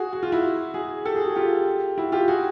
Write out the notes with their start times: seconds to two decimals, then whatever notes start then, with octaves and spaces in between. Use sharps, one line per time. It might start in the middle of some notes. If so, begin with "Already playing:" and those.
Already playing: F#4 G#4
0.13 F#4
0.23 F4
0.32 E4 F#4
0.74 F#4 G#4
1.05 G4 A4
1.15 F#4 G#4
1.25 F#4 G#4
1.35 F4 G4
1.98 E4 F#4
2.12 F4 G4
2.28 F#4 G#4